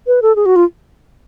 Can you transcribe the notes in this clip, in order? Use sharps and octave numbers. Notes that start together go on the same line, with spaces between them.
B4
A4
G#4
F#4
F4